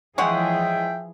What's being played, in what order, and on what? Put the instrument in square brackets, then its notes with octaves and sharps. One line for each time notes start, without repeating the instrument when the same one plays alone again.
[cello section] E3 F3 G#4 [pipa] G#3 C#5 F#5 [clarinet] E5 [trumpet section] G5